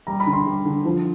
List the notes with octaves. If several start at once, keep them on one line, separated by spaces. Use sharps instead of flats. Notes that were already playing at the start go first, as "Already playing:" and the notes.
G3 A#5
B5
D3
C6
G3
D3
F3